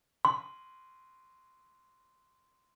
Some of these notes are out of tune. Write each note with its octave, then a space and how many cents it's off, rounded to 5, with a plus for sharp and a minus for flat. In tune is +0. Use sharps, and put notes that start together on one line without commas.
C6 -10